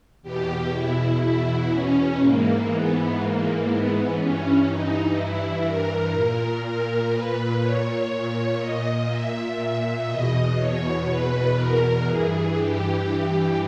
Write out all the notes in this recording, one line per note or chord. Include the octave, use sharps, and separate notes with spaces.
E2 B2 G4
E4
E4
C#4
G#2 E3 A#3
B3
A#3
B3
G2 E3 C#4
D#4
E4
A#4
A#2
A#4
B4
C#5
A#2
D#5
E5
E2 B2 D#5
C#5
B4
A#4
G2 E3 G#4
G4